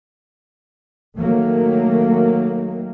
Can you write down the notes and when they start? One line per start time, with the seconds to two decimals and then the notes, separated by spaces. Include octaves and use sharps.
1.17 D#3 F#3 A3 A#3